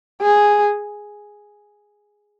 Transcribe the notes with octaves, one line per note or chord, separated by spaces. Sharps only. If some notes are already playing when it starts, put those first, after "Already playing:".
G#4